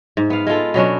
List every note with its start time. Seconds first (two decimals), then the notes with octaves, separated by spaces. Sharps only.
0.17 G#2
0.30 B3 F5
0.47 G#3 B3 F4 A4
0.74 B2 F#3 C#4 D4